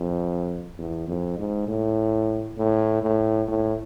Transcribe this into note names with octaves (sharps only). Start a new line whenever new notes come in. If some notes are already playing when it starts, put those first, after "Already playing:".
Already playing: F2
E2
F2
G#2
A2
A2
A2
A2